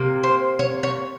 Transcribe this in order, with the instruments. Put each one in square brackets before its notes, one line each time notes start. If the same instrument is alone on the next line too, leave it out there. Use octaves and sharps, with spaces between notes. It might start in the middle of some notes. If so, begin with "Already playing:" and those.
Already playing: [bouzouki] C3 A#3
C5
C#5
C#5